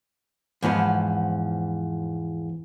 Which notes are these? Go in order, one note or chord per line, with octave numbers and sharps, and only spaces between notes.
E2 G#2 F3 B3